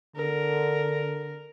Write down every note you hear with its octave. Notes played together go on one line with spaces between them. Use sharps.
D3 A#4